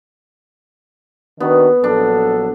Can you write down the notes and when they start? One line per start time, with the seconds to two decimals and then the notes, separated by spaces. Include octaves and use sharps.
1.40 D#3 B3 D4 F#4
1.84 A#1 F#3 D4 A4